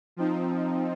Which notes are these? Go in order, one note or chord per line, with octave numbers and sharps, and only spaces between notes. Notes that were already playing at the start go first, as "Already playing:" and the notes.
F3 C4 D#4